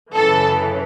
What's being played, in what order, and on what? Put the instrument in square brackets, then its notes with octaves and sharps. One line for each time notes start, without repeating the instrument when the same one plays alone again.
[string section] F#2 C#3 E3 A4